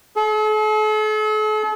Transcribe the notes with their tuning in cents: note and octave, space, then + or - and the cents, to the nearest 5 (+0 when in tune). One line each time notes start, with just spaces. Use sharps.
A4 -45